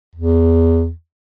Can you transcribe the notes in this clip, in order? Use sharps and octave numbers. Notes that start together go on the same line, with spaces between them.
E2